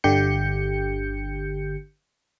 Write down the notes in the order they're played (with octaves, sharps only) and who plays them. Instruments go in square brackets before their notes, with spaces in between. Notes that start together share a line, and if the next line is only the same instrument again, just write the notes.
[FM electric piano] G1 D3 G4 G6 C#7